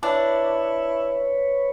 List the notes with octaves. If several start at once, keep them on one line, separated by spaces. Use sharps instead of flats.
D4 E4 B4 C#5